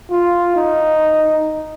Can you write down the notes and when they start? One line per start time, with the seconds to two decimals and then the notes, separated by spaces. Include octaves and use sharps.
0.10 F4
0.56 D#4